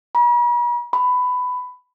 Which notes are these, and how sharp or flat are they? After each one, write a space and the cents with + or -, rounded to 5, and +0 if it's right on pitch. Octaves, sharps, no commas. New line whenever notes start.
B5 -45
B5 +15